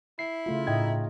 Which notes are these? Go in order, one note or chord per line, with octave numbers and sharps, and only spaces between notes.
E4 C7
C#3 A3 F4
A2 D#4 D#5 G5 G#6